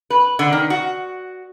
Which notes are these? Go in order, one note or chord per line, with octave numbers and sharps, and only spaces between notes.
B4
D3
D#3
F#4